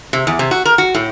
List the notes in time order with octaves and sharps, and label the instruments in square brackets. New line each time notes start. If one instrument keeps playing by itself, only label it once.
[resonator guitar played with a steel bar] C3
E2
C3
F#4
A#4
F#4
A2